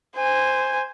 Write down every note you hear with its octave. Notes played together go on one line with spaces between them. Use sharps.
C5 G#5